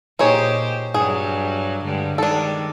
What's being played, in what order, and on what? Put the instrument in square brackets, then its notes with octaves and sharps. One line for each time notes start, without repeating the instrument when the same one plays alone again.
[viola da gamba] A#2 G4 C5 [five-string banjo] D#4 G#4 C#5
[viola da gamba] G2 F#3 [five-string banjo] G#4
[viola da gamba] G2 D3 G#3
[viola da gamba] D#3 G3 G#3 [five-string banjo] D4 A4